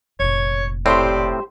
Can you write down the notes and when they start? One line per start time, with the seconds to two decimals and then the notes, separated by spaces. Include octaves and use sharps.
0.20 F1 A#2 C#5
0.86 A2 C4 G4 C5 D5 C6